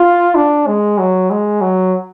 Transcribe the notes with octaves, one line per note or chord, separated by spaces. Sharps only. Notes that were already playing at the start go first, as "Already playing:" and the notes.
Already playing: F4
D4
G#3
F#3
G#3
F#3